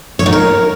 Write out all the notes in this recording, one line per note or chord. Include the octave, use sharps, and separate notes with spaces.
C#5
D#4
A#4